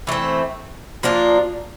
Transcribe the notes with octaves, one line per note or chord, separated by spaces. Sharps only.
E3 A3 C4
F3 A#3 D4 F4